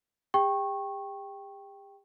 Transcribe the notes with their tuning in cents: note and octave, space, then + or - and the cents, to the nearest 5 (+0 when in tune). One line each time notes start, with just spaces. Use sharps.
G4 +45 G5 +0 C#6 -20